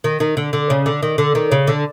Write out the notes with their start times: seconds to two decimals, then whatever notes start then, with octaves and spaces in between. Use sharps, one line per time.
0.04 D#3
0.20 D#3
0.37 D3
0.53 D3
0.70 C#3
0.86 D3
1.02 D#3
1.18 D3
1.35 D#3
1.52 C#3
1.67 D3